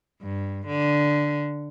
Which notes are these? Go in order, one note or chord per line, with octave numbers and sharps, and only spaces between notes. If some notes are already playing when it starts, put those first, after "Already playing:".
G2
D3